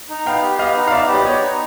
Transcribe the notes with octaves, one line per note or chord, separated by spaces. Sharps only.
D#4
B3 F5 G5
G4
B3 D#5 F5
D#4
F5
B3 D5 E5
G4
D5
B3 C#5 D#5
D#4